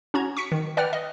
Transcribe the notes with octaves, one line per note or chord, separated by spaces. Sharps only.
C#4 F#4 A#5 G#6
C#6 B6 C#7
D#3
B4 D5 F#5 G5 F6
D#5